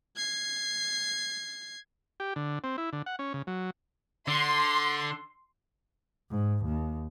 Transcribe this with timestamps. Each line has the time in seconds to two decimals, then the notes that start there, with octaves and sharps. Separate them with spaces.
0.16 G#6 C7
2.20 G4
2.36 D3
2.64 C4
2.78 E4
2.93 D3
3.06 F#5
3.19 C#4
3.34 C#3
3.47 F#3
4.28 D3 C6
6.31 G#2
6.65 D#2